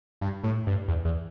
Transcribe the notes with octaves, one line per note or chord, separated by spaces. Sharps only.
G2
A2
G2
E2
E2